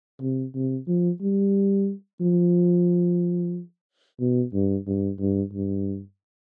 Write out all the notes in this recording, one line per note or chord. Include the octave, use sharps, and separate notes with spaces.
C3
C3
F3
G3
F3
B2
G2
G2
G2
G2